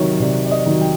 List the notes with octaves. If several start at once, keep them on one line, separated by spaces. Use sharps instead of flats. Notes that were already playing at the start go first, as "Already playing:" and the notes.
Already playing: C3 D#3 F#3 C#5
C3 D5
D5
D#5
D#3 F#3
G5